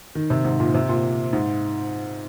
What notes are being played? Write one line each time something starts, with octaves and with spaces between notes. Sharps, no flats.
D#3
C3
G#2
A#2
C3
A#2
G#2